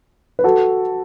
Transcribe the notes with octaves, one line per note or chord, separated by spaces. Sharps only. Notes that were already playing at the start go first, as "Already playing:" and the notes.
B4
F#4 A4